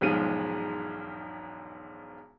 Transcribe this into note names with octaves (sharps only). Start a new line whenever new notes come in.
E1 B1 G#2 F3 G#3 D#7